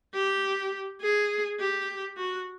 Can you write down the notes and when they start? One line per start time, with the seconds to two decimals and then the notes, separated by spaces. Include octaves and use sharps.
0.14 G4
1.01 G#4
1.59 G4
2.17 F#4